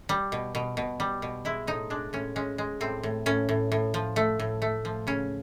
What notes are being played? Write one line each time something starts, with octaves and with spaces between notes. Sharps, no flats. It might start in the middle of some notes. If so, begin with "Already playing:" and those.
G3
B2
B2
B2
G3
B2
G#3 E4
A2 D#4
G#3 D4
A2 C#4
G#3 C#4
G#3
A2 C4
A2
A2 C#4
A2
A2
F3
A3
A2
A3
F3
C#3 C#4